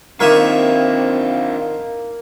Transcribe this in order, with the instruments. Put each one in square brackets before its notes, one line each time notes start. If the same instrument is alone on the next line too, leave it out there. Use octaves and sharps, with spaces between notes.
[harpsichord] D#3 E5 C#6 [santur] A#3 [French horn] C4 [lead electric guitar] D4 F4